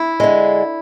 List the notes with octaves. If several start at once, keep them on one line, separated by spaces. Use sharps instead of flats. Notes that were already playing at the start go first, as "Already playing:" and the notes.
Already playing: E4
D3 G#3